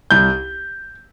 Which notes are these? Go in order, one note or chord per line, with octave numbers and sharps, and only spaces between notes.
C2 G6